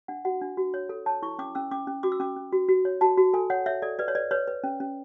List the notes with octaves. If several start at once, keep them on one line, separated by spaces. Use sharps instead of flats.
D4 F#5
F#4 F#5
D4
F#4
C#5
A4
C#5 A5
E4 C#6
C#4 D6
C#4 E6
C#4 D6
C#4
F#4 D6
E6
C#4 D6
C#4
F#4
F#4
C#5
F#4 A5
F#4
A4 G#5
C#5 F#5
C#5 E5
A4 D5
B4 D5
C#5
B4 D5
B4 C#5
B4
C#4
C#4